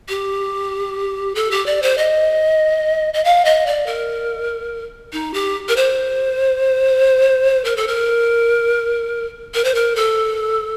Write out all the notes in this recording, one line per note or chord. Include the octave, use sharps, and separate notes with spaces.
G4
A4
G4
D5
C5
D#5
D#5
F5
D#5
D5
A#4
D#4
G4
A#4
C5
A#4
A4
A#4
A#4
C5
A#4
A4